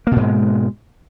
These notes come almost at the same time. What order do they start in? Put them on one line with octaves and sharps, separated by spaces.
A#3 B2 G#2 G#3